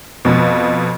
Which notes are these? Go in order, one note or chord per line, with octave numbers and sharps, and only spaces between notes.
F2 B2